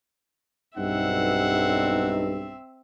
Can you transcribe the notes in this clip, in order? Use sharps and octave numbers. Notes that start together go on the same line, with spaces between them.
B1 G2 C4 D#4 E5 F#5